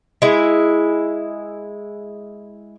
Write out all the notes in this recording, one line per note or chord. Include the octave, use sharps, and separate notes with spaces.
G#3 E4